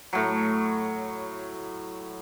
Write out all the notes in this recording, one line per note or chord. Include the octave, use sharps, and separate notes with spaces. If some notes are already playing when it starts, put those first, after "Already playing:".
A2 F#3